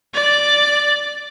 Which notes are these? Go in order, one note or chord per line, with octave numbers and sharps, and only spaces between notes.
D5